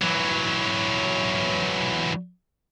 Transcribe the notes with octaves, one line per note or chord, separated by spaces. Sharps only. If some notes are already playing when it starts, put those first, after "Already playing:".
E3 F#3